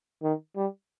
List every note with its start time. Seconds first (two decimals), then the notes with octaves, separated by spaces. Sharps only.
0.23 D#3
0.56 G3